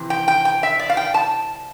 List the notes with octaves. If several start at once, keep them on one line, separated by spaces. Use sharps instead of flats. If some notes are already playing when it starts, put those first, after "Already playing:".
Already playing: C3 E3
G5
G5
G5
E5
D5
F5
G5
A5